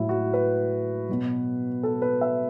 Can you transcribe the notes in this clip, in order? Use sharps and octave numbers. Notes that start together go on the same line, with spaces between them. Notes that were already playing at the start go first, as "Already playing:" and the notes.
Already playing: A2 F#3 E4
F#4
B4
B2 F#3
A4
B4
E5